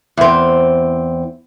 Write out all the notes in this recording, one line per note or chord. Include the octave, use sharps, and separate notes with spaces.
E2 C4